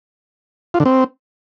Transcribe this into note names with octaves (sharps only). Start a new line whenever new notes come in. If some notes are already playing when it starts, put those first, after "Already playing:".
F4
D3
C4